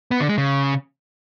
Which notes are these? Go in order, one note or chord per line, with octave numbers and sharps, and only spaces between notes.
B3
D3
G#3
C#3